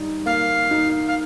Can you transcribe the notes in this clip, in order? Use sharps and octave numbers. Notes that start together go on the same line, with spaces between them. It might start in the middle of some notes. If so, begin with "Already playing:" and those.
Already playing: G3 D#4
A#3 F5
D#4
F5